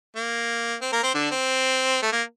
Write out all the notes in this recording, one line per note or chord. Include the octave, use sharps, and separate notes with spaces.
A#3
C4
A#3 A#4
C4 C5
D3 D4
C4
A3
A#3